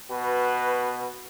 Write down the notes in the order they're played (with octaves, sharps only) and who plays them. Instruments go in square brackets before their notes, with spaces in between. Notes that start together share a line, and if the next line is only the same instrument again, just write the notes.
[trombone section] B2 F#4 B4